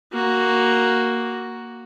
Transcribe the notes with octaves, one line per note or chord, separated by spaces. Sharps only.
A#3 F#4